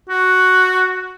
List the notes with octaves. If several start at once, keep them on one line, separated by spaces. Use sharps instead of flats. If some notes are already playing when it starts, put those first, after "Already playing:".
F#4